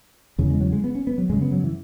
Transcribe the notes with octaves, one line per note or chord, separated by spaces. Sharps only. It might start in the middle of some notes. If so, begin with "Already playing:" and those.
E2 C#3
G#3
F#3
G#3
B3
C#4
B3
F#3
F#2 C#3 G#3
B3
F#3
E3